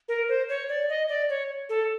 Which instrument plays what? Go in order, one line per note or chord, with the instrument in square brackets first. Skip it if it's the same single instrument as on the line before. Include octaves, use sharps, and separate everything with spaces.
[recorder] A#4
C5
C#5
D5
D#5
D5
C#5
A4